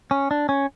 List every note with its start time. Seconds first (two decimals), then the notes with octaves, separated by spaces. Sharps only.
0.11 C#4
0.31 D4
0.49 C#4